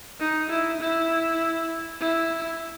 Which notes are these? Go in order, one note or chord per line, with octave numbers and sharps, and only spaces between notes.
D#4
E4
E4
E4